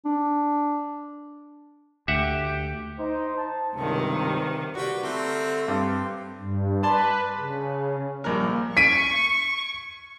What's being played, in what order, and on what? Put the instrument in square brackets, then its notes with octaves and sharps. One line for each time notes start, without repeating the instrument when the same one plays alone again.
[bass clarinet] D4
[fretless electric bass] D2 [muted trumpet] G4 [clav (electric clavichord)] E5 F#5
[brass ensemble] D#4 C5
A5
[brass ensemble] C#2 G2 [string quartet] C3 D#3
[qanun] G3 G5 [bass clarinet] F#4 [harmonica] B4
[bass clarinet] D3 [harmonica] A3 C4 [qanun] A#4
[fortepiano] G2 [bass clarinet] C4
[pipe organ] G2
[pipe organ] B4 [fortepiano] D5 A5 C6
[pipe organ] C#3
[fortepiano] A#1 A#4 [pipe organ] G3 A#3
[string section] C#6 [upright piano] B6 D7 D#7